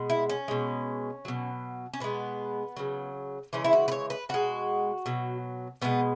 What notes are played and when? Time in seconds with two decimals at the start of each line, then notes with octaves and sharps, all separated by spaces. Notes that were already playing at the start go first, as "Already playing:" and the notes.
Already playing: B2 G#3
0.10 E4
0.30 C#4
0.48 B2 G#3
1.25 B2 F#3
1.93 C#4
2.00 B2 G#3 B3
2.77 C#3 F#3
3.53 C#3 E3 G#3 C#4
3.64 E4
3.73 F#4
3.88 B4
3.92 C#5
4.10 B4
4.29 B2 G#3 F#4
5.06 B2 F#3
5.82 B2 G#3 B3